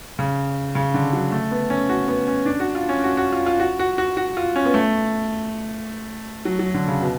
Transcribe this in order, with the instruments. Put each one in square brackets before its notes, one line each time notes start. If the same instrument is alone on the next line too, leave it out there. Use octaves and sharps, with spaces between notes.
[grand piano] C#3
C#3
D3
F#3
A3
B3
C#4
F#4
B3
C#4
D4
F#4
F4
C#4
F#4
F#4
F4
F4
F#4
F#4
F#4
F#4
F4
C#4
B3
A3
F#3
F#3
D3
C#3
B2